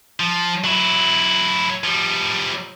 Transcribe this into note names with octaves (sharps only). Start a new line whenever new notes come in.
F3
F#3 E4
F3 G3